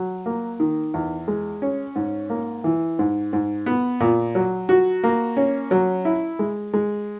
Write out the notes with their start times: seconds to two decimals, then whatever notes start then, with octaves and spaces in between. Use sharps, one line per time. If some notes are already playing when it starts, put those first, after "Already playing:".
Already playing: F#3
0.26 A#3
0.60 D#3
0.94 E2
1.28 G#3
1.62 C#4
1.96 G#2
2.30 A#3
2.64 E3
2.99 G#2
3.33 G#2
3.66 B3
4.00 A#2
4.35 F#3
4.69 F#4
5.04 A#3
5.37 C#4
5.71 F#3
6.05 E4
6.39 G#3
6.74 G#3